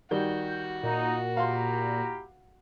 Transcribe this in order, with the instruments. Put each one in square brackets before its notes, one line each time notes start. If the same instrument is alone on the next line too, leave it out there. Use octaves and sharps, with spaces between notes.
[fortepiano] D#3 G3 [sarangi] F#4 [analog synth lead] G6
[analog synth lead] A#2 [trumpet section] D#4
[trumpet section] E4 G4 A#5 [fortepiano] F5 C6